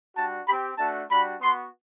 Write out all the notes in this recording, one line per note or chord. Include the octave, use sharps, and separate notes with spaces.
G3 D4 F#4 A5
C4 G4 B5
A3 D4 F#4 A5
G3 D4 F#4 B5
B3 F#4 C6